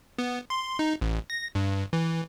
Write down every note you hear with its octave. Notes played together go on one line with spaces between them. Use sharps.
B3
C6
D#4
A1
A#6
G2
E3